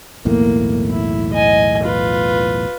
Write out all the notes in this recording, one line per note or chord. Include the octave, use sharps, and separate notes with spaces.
B1 E2 A2 A#3
E4
D#5 G#5
F4 B4